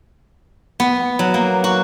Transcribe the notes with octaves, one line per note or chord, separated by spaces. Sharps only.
B3
F#3
A#3
F#4